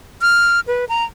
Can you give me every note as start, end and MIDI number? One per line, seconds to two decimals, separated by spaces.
0.22 0.60 89
0.67 0.85 71
0.89 1.04 82